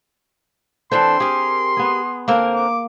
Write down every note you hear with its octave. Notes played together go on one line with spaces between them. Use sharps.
E3 C4 D4 A4 C5 C6
G4 G#4 A#4
B3 G#4
D3 A#3 C4 A#4
D6